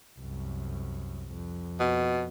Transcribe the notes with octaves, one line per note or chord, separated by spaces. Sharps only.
C2 F#2
F2
B2